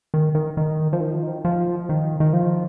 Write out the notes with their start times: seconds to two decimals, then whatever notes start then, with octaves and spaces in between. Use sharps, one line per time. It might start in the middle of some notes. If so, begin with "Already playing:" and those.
0.14 D#3
0.35 D#3
0.57 D#3
0.93 F3
1.00 D#3
1.14 F3
1.23 D#3
1.45 F3
1.89 D#3
2.20 D#3
2.33 F3